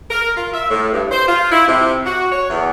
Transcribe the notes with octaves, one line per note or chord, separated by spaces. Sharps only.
A#4
F4
E5
A2
G2
C5
F4
E4
C3
F#4
C#5
E2